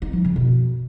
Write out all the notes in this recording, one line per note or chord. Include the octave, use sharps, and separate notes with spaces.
D#4
F3
C#3
B2